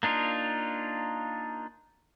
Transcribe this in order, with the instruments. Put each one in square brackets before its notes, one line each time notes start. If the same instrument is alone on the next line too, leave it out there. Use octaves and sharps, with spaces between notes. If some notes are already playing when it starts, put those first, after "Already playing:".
[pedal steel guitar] A#3 D4 D#4 F4